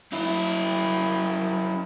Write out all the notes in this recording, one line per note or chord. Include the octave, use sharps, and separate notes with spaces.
F#2 E4